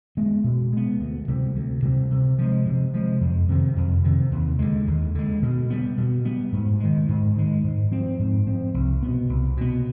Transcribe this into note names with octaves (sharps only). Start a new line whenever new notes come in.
G#3 B3
B2
G#3 B3
D2
C3 G3
D2
C3 G3
C3
F3 G#3
C3
F3 G#3
F2
C3 D#3
F2
C3 D#3
D#2
D3 G#3
D#2
D3 G#3
B2
G3 B3
B2
G3 B3
G#2
D#3 G#3
G#2
D#3 G#3
G#2
F3 C4
G#2
F3 C4
C2
B2 B3
C2
B2 B3